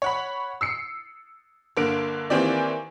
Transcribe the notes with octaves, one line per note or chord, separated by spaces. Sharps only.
C#5 F#5 B5
E6 C7 C#7
G1 D3 A#3 D7
D#3 E3 A#3 C4 G4 D5